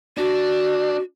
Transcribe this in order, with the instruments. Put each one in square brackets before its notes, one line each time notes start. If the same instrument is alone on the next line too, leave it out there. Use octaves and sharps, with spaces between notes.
[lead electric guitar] D4 [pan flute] F#4